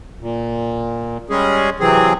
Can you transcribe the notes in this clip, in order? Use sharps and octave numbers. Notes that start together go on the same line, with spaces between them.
A#2
G3 G#3 C#4 G#4
C3 E3 F#3 C4 G#4